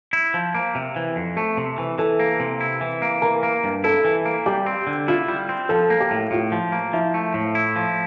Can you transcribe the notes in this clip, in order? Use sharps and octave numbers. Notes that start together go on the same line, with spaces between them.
E4
F3
A#3
C3
E3
F2
A3 A4
C3
E3
E3 A4
A#3
C3
E4
E3
A#3
E3 A#4
A#3
G2
E4 A4
E3
A#3
G3 G4
C4
D3
E4 F4
G3
C4
F3 A4
A#3
G4
A2
A2 F4
F3
A#3
F3 E4
A3
A2
E4
F3